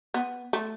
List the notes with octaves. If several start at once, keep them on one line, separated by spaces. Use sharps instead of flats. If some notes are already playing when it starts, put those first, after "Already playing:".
B3
A3